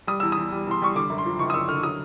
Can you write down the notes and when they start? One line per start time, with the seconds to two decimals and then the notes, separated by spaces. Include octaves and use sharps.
0.07 G3 D#6
0.20 E2 E6
0.32 E2 D#6
0.52 G3
0.67 E2 C6
0.82 G3 C#6
0.95 D3 D6
1.10 F#2
1.18 C6
1.26 F3
1.39 F#1 C#6
1.50 D#6
1.54 F#2 E6
1.69 D3 F6
1.83 F#3 D#6